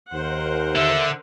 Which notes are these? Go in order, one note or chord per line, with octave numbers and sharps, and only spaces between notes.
D#2 A#4 C5 F#5
D3 E5